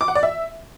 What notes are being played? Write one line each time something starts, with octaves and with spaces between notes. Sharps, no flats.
D6
F#5
D5
E5